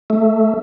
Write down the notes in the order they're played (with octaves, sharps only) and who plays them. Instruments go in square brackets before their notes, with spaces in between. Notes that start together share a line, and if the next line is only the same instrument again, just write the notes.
[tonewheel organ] A3